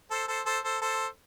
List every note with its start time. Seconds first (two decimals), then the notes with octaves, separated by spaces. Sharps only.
0.11 A4 C5
0.28 A4 C5
0.46 A4 C5
0.64 A4 C5
0.82 A4 C5